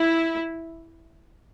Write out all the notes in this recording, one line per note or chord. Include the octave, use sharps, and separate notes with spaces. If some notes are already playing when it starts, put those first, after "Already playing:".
Already playing: E4